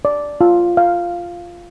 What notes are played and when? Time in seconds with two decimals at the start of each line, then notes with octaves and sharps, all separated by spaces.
0.05 D5
0.41 F4
0.77 F5